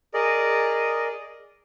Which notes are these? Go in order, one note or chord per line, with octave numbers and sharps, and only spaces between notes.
G#4 A#4 D5 D#5